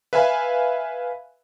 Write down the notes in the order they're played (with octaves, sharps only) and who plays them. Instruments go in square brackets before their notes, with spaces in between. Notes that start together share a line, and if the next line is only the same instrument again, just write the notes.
[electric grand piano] B4 E5 F5 G#5 B5